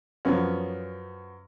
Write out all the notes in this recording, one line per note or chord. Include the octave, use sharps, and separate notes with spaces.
F#2 F3 B3 C#4